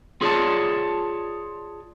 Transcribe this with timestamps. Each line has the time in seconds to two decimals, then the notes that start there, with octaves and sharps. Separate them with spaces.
0.21 F4 G#4 B4 C#5 D5 A5